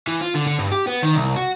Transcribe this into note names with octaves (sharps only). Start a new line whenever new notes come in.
E3
F4
D3
D3
G2
G4
B3
D#3
C2
F#4